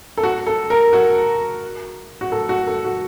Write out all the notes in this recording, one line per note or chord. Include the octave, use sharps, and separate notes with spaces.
A4
F#4
A4
A#4
F#4
F#4
A4
F#4
A4
F#4